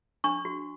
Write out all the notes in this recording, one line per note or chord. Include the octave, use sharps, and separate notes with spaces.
D4 C#6
F#4